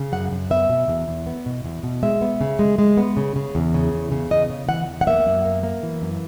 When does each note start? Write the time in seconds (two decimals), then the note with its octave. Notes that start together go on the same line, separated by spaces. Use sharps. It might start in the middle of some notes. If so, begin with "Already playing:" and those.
Already playing: C#3
0.12 F#2 F#5
0.32 F#2
0.50 B3 E5
0.70 B2
0.88 E2
1.08 E2
1.27 B3
1.46 B2
1.65 E2
1.83 B2
2.03 G#3 E5
2.21 B3
2.41 C#3
2.59 G#3
2.79 G#3
2.97 B3
3.17 C#3
3.36 C#3
3.55 E2
3.74 C#3
3.93 E2
4.12 C#3
4.31 E2 D#5
4.50 C#3
4.69 E3 F#5
4.88 E2
5.01 F#5
5.07 A#3 E5
5.26 F#2
5.45 A#3
5.63 A#3
5.83 E3
6.02 F#2